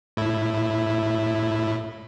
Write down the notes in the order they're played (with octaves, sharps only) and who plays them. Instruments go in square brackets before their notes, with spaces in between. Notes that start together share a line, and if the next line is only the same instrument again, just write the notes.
[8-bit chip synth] A2 E4